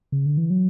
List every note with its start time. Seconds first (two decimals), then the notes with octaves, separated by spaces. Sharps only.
0.12 C#3
0.26 D3
0.37 E3
0.50 F#3